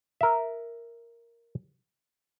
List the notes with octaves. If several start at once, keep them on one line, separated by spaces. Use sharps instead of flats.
A#4 E5